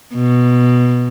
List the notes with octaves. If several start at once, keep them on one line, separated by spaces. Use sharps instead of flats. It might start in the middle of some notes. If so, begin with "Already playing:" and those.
B2